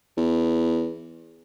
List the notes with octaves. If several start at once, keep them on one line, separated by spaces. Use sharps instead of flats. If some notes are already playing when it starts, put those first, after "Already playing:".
E2